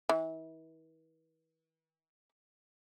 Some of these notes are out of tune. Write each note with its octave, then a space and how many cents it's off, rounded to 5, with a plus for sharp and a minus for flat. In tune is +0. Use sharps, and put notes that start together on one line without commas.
E3 -40